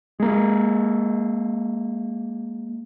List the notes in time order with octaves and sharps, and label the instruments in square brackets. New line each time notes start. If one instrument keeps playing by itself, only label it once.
[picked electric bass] G#3 A#3